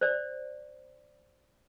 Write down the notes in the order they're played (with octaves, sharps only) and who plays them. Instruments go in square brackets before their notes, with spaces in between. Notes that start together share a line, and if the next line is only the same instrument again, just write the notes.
[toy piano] C5 D5